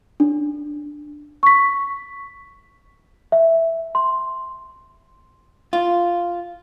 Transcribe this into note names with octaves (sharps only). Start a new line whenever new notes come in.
D4
C#6 B6
E5
C6
F4